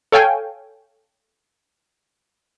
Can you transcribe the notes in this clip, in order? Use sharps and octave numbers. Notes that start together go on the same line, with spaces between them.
A4 C#5 F5 G5 G#5